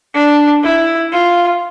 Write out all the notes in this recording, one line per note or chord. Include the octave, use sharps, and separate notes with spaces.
D4
E4
F4